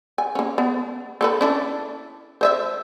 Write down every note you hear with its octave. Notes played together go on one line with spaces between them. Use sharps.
G#5
A#3 C#4
B3
A#3 A4 B4
C#4 D4 E4
C5 D#5 E5